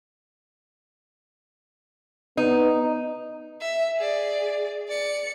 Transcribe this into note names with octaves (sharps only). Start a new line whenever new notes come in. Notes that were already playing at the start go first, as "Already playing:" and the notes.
B3 D#4
E5
G#4 D5
D5 C#7